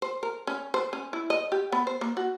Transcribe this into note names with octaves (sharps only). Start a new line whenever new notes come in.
C5
A#4
C#4
C5
C#4
E4
D#5
G4
B3
C5
A#3
F#4